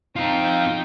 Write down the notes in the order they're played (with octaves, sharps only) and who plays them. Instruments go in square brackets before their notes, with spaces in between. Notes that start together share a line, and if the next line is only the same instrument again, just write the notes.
[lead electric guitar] C4 F4 [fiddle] D#4 G5